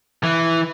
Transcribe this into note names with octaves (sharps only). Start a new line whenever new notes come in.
E3